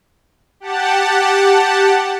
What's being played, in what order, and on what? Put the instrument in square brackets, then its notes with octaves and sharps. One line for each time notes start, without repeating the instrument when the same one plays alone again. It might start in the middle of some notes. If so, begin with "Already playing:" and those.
[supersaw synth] G4 F#5 A5